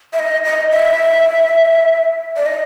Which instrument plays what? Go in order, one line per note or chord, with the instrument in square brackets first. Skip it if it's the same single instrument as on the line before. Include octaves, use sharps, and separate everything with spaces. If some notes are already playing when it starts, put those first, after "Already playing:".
[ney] E5
D#5
D#5
E5
D5
D#5